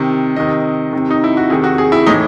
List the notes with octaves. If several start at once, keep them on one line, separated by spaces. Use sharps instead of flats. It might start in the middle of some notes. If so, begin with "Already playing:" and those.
Already playing: C3 D#3
C3 D#3 D#5
C3 D#3
D#4
E4
F#4
C3 D#3 G#4
F#4
G#4
E4
A2 E3 D#4